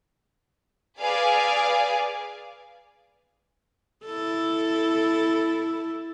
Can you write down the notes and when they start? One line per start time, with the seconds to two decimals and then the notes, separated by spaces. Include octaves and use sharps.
1.00 G#4 B4 D5 F5
4.05 E4 A4